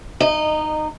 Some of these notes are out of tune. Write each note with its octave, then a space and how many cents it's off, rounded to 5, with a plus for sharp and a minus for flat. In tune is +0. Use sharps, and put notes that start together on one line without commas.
D#4 -15 D#5 -25